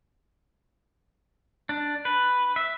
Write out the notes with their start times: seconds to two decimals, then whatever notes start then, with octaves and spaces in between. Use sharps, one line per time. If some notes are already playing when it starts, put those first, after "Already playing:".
1.69 D4
2.05 B4
2.56 E5